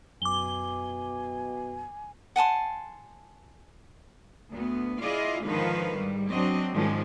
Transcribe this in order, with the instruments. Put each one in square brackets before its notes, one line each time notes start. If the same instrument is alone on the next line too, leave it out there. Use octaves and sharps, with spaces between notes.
[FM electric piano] F#2 [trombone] B2 [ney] G#5 [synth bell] D6 G7
[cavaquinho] F#5 G#5 A5 C6
[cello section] D2 B3
E4 F4 G#4 D5 D#5 F5
G#2 D3 D#3 F3 B4 F5
G#2 G3
F#3 C4 D4 D#5
G#2 D#3 F3 G#3 C#4 D4